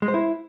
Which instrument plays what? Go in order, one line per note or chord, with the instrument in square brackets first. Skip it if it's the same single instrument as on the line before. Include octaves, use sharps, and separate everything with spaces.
[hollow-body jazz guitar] G#3
C5
E4